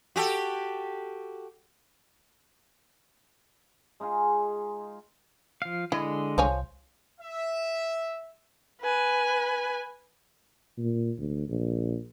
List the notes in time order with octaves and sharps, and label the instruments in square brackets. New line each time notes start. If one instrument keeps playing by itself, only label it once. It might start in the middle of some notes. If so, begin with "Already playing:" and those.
[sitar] F#4 G4 A4
[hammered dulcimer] G#3 D#4 F4 G#4
[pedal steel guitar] F3 F5
[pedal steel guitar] D3 G#3 D#5 [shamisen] E4
[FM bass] C2 [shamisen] F3 C#5 G#5
[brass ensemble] E5
[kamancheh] B4 G#5
[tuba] A#2
D2
A#1